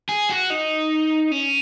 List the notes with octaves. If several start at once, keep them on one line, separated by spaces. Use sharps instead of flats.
G#4
F#4
D#4
C#4